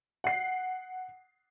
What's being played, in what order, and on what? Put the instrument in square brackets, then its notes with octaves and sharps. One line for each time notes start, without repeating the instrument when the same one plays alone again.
[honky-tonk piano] F#5 C7